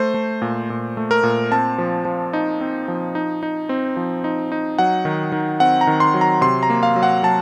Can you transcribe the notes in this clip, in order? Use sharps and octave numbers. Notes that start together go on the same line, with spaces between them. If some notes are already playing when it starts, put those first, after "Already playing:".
Already playing: A3 C5
A3
A#2
A#2
A3
A#4
A#2
C4 A5
F3
F3
D#4
C4
F3
D#4
D#4
C4
F3
D#4
D#4
F#3 F#5
D#3
D#3
C4 F#5
A#5
D#3
C6
F#3
A#5
C3 C6
A#5
A#3
F5
F#3
F#5
F#3 A5